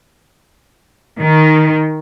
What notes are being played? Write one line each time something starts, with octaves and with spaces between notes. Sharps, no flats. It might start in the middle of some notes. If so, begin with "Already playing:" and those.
D#3